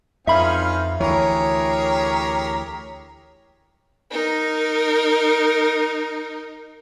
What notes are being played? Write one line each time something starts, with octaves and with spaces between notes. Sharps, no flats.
F2 E3 C4 C#4 D#4 F4 E5 B5
D2 E3 G4 G#4 A#4 C#5
D#4 A#4